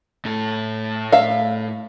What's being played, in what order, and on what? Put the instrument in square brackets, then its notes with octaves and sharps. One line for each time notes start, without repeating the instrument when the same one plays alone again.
[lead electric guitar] A2 A4
[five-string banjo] E5 F5